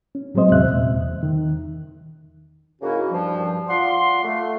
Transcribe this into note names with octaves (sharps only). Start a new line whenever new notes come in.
C#4
A2 F#3 G#3 C4 C5 D#5
E2 C3 E5 F#6
A#2
E2
D#3
G#2 C#3 A#3 C#4 E4 F#4
G2 F3
F4 D5 F#5 C6
A3